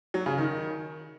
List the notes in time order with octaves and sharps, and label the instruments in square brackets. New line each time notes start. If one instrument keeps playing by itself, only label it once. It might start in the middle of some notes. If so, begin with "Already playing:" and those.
[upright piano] F#3
C#3
D#3